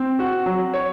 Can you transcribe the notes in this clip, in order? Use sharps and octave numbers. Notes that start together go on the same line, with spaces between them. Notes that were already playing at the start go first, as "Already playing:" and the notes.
Already playing: C4
F#4
F#3
C#5